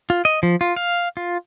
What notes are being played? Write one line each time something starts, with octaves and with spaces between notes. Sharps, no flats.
F4
D#5
F3
F4
F5
F4